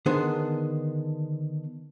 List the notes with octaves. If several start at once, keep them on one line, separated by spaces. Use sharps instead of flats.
D3 D#3 B3 D4 G#4 C5